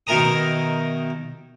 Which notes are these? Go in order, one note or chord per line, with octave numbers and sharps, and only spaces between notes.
B2 D#3 E4 A#4 A#5 D#6